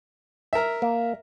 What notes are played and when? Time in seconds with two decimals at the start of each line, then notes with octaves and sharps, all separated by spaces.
0.53 A#4 E5
0.82 A#3